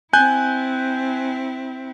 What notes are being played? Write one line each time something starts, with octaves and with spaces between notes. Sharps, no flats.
C4 E4 G#5 F#6 G6